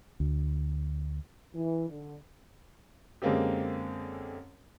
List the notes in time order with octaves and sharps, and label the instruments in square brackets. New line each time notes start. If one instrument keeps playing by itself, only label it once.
[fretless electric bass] D2
[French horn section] E3
D3
[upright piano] F#2 D3 G#3 A#3 C4 G4